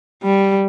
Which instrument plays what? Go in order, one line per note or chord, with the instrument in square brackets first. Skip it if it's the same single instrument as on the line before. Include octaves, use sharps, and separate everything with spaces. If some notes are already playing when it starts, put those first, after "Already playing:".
[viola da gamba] G3